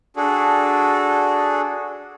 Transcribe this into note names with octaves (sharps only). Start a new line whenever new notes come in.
D4 F#4 G#4 A4